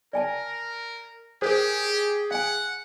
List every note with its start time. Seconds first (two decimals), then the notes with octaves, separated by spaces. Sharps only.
0.13 A#4 D5 G#5 A5
1.42 G4 G#4 A#4 C5
2.31 F5 F#5 G#5